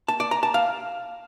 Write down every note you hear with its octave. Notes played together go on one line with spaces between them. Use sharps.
A5
D5
A#5
A5
F5